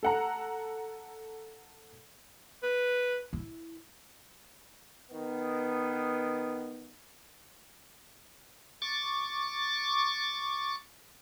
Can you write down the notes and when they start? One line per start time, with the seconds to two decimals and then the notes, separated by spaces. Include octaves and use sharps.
0.03 A4 F#5 A#5
2.63 B4
3.33 E4
5.11 D#3 B3
8.82 C#6 D6 A6